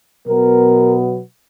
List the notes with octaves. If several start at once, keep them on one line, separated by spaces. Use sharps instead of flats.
B2 F#3 B3 A#4